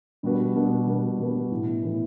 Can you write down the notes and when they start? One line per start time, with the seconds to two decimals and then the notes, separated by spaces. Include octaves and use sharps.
0.23 B2 G3 D4 F#4 B4
0.56 B2 G3 D4 F#4 B4
0.87 B2 G3 D4 F#4 B4
1.19 B2 G3 D4 F#4 B4
1.51 A2 E3 B3
1.83 A2 E3 B3